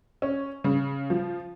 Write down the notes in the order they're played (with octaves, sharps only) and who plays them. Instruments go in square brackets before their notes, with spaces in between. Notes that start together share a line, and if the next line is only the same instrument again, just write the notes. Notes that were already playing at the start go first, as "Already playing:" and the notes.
[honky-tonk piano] C#4
C#3
F3